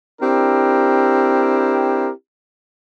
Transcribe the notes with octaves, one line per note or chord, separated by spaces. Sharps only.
C4 D4 E4 G4 A#4